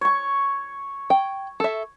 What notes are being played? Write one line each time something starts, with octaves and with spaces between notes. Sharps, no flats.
C#5 C#6
G5
A4 E5